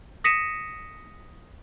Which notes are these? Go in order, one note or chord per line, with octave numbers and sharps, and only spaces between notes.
D#6 A#6 B6 C#7 D#7 E7